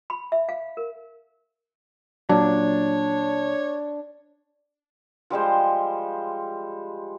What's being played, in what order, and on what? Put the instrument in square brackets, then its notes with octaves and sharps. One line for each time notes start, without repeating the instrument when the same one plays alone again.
[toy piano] B5
E5
F5
A#4
[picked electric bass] A#2 F#3 [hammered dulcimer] D4 [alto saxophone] C#5
[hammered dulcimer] F3 G3 G#3 C5